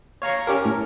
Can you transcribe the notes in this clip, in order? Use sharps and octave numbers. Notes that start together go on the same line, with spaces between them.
C#5 F5 A#5 C#6
C#4 G4 A#4
A2